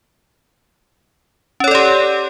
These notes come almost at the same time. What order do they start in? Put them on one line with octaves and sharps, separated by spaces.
C#4 C#5 A4 D5 G4